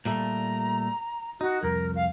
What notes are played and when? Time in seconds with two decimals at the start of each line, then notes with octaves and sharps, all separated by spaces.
0.05 A#2 G3 A3 A#5
1.41 D#4 F#4
1.63 C2 F2 A#4
1.95 F5